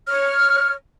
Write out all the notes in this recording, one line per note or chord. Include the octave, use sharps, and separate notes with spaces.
C#5 F6